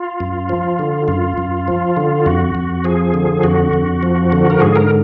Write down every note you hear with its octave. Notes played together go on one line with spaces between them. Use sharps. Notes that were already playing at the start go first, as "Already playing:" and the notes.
Already playing: F4
F#2
F3
D3
F#2 F4
F#2
F3
D3
F2 F#4
F2
F3 G#4
D3
F2 F#4
F2
F3
D3
A#4
G#2 G#4
A#4